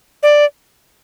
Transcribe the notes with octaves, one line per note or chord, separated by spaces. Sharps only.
D5